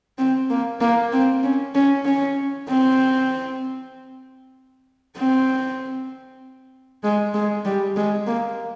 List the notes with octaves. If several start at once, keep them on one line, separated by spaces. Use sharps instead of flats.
C4
A#3
A#3
C4
C#4
C#4
C#4
C4
C4
G#3
G#3
G3
G#3
A#3